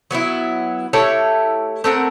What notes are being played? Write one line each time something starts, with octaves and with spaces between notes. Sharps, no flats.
F#3 B3 D#4 E4
A3 E4 G4 C#5
A3 C4 A#4 F#5